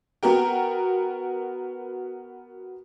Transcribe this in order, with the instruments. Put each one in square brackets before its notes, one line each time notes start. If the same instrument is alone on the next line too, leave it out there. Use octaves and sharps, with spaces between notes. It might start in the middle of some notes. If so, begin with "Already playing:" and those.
[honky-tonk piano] B3 F#4 A#4 G5